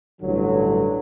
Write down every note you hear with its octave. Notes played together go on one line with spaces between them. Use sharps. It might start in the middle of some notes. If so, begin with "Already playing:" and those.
A1 G2 D3 F#3